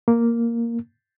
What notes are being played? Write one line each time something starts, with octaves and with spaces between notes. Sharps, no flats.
A#3